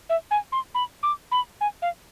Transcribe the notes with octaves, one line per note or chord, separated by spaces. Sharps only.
E5
G#5
C6
B5
D6
B5
G#5
F5